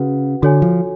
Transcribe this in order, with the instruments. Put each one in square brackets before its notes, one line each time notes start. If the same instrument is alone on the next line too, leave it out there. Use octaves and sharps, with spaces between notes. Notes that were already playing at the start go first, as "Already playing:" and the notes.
Already playing: [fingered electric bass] C#3 [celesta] F#4 B4 F#5
[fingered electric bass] D3 [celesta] F#4 A4 C#5 G#5
[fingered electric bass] F3